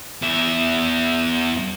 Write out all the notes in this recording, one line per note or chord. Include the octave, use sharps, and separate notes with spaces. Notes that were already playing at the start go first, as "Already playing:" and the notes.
E2 E5